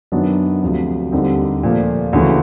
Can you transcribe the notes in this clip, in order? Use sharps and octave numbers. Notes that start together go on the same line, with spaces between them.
F#2 D#3 F#3 B3 D4
D2 C3 F3
D#2 D3 G3 C4 D#4
A#2 F3 A3
D2 C#3 E3 A3